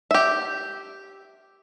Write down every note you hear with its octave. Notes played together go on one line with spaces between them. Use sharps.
G4 E5